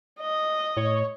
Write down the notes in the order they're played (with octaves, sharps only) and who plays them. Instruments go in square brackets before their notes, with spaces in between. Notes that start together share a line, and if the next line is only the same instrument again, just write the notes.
[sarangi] D#5
[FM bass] A2 [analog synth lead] C#5